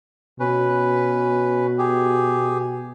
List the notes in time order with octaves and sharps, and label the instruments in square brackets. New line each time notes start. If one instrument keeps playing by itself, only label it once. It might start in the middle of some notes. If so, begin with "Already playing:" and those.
[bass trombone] B2 [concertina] C#4 B4
[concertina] G4 G#4